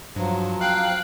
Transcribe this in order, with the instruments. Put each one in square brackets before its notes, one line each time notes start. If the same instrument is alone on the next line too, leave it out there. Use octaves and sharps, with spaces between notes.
[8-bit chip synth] G2 [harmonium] F3 F#3
[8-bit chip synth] F5 G5 [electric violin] F#6